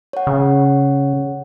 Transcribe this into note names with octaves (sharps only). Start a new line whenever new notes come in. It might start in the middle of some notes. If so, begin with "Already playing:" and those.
C#5 F#5
C#3